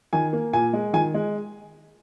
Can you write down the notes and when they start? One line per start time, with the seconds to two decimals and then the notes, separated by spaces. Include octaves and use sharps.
0.13 D#3 G#5
0.33 A#3
0.53 A#2 G#5
0.73 G#3
0.93 D#3 G#5
1.14 G#3